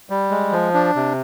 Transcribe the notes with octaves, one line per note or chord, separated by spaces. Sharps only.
G3
G#3
F3
D4
C3